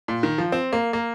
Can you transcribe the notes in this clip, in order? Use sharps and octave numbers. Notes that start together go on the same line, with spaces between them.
A#2
D#3
F3
C4
A#3
A#3